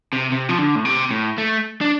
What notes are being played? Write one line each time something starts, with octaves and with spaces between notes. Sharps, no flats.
C3
C3
F3
D3
A2
C3
A2
A3
D4